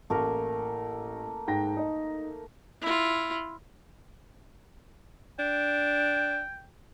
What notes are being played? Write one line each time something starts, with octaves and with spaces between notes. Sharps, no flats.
A1 A3 A#3 A#4
G#2 G5 A#6
D#4 D#5
E4 F4
D4 G5